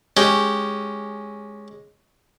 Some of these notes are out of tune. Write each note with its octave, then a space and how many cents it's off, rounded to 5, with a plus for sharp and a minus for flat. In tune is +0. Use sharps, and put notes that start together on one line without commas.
G#3 +0 C#4 +0 G4 +0